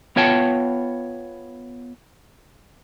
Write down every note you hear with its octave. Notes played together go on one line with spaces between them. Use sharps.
B3 F4 C#5 G5 A5